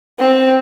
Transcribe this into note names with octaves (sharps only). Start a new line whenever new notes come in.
C4